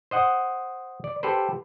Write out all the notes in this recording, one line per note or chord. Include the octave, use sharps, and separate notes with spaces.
C5 D#5 F#5
D5
G4 A4 B4 C5